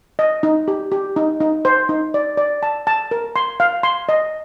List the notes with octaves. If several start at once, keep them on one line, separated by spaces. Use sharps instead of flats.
D#5
D#4
G4
G4
D#4
D#4
C5
D#4
D5
D5
A5
A5
A#4
C6
F5
C6
D#5